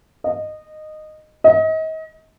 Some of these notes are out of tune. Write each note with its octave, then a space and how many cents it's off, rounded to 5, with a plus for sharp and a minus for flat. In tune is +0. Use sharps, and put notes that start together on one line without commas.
D#5 -15
D#5 +35